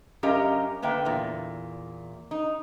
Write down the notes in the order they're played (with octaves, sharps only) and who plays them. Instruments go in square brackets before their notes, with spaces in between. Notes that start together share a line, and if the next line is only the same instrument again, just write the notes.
[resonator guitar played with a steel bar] F#2 C#4 G4 A#4 D#5 F5
D3 A#3 B4 E5 G5
E2 A#2
D#4